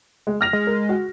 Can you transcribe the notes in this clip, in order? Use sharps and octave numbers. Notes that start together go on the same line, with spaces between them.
G#3
F6 A#6 F7
G#3
A#4
F#4